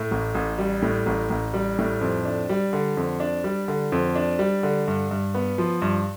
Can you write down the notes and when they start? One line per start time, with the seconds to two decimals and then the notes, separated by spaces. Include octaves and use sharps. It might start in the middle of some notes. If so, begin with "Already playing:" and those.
Already playing: A2
0.11 A1
0.35 A1
0.58 G3
0.82 A2
1.06 A1
1.30 A1
1.54 G3
1.79 A2
2.01 F2
2.25 D4
2.49 G3
2.73 D3
2.97 F2
3.20 D4
3.44 G3
3.68 D3
3.92 F2
4.15 D4
4.39 G3
4.63 D3
4.88 G2
5.11 G2
5.35 B3
5.58 F3
5.82 G2